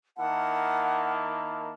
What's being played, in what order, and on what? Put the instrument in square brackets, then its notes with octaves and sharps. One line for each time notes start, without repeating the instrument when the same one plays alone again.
[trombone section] D#3 A#3 E4 [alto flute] F#5 [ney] A5